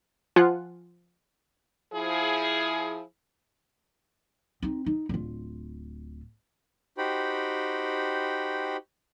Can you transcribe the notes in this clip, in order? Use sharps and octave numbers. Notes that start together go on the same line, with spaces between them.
F3 F4 F#5 G#5 F#6
F3 E4 G#4
C4 D#4
D#4
D1 F4
D#4 F#4 G4 C5 G5 B5